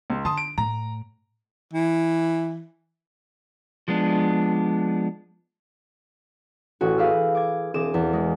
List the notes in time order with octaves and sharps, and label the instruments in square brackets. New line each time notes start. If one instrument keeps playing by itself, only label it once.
[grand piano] C#2
[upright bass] D3 [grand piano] A5 C6 D#6
[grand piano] D7
[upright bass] A2 [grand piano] A#5
[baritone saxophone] E3
[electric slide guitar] F3 G#3 B3 D4
[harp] A1 C#4 F#4
G#4 B4 F5 D6 E6 F6
D6 G#6
E1 E3 C4 G#4 D6 E7
E2
G#3